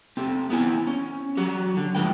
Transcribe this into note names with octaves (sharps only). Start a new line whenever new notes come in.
C4 G4 A4
B3 C4 E4 G#5
C#4
F#3 F#4 G4
D3
A2 F3 G#3 B4 G5